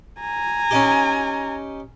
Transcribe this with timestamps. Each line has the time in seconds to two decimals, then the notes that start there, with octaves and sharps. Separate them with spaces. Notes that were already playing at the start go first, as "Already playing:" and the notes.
0.20 G#5 A#5
0.71 C#4 D#4 G4